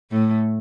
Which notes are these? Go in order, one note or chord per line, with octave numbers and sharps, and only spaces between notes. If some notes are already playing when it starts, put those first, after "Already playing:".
A2 A3